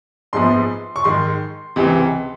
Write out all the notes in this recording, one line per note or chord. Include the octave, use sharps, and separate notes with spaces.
A#1 G#2 F3 G#3 B3 C6
C#6
G#2 D#3 G#3 C6
C#2 C3 E3